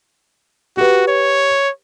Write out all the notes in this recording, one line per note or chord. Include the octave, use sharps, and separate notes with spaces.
F#4 G4 B4
C#5